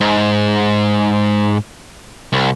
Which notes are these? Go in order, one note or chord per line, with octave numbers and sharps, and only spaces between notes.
G#2
C2